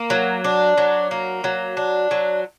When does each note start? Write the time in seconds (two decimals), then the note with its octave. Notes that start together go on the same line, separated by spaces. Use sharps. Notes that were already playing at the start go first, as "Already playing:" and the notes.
Already playing: A#3
0.10 F#3
0.44 D4
0.78 F#3
1.11 A#3
1.44 F#3
1.77 D4
2.11 F#3